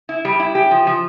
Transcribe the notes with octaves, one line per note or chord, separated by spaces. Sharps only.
E4
G3
E4
G4
F3
F3